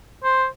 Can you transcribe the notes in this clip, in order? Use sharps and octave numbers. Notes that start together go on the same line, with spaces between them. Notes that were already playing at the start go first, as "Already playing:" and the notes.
C5